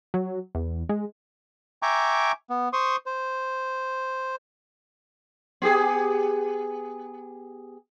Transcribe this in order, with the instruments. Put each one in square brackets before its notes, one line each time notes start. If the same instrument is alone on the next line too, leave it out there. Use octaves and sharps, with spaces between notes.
[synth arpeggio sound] F#3
E2
G#3
[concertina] E5 G5 G#5 A#5 C#6 D6
B3
C5 C6 C#6 D#6
C5
[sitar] B3 G4 G#4